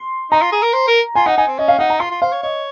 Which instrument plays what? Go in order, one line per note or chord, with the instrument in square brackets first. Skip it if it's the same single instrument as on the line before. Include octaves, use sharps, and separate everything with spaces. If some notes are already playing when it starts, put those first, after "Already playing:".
Already playing: [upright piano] C6
[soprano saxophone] D#4 [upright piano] A#5
[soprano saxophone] F4
G#4
A#4
C5
A#4
[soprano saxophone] F4 [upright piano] G#5
[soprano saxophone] D#4 [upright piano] F#5
[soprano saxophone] D#4 [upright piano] G#5
[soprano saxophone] C4
[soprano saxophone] C#4 [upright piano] D#5
[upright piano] F5
[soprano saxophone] D#4 [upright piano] F#5
[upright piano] A#5
[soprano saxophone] F4 [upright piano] C6
[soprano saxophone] F4
[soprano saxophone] C5 [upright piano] F5
[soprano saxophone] C#5
[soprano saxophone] C#5 [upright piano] D#5